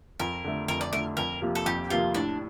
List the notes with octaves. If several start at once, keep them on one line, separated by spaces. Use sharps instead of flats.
F2 A#4
D3 A3
F2 A#4
D5
D3 A3 A#4
F2 A#4
C3 F3 A#3
A4
F2 G4
C3 F3 A#3 F4
A2 D4